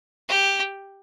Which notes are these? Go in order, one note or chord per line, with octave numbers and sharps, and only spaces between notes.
G4